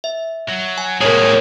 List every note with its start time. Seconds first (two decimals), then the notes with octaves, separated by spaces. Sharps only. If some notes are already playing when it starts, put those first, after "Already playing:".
0.04 E5
0.49 F#3
0.78 G#5
1.01 C2 A2 A#3 G#4 A#4 C#5